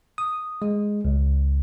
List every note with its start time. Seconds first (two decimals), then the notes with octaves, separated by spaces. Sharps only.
0.18 D#6
0.62 G#3
1.05 C#2